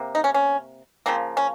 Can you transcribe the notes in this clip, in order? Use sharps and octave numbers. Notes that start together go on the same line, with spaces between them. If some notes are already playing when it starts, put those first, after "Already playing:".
Already playing: C3 A#3
D#4
C#4
C#4
C#3 F3 A#3 C4
C#4